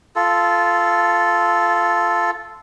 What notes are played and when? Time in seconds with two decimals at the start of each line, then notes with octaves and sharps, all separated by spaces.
0.16 F4 A4